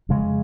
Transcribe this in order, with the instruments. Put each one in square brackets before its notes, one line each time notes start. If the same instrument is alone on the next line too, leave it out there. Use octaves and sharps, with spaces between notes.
[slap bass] F2 C#3 G#3